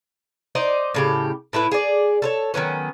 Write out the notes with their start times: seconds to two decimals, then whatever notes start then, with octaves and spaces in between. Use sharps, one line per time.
0.55 D#4 C5 D5 D#5
0.94 A2 C#3 G4
1.53 A2 E4 F#4 B4
1.71 G#4 D5
2.22 A4 C5 C#5
2.54 D#3 F#3 B3 C#4